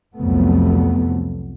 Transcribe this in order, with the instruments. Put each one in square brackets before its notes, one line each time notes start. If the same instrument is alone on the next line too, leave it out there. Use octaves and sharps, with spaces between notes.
[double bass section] C2 F2 C3 F#3 A3 B3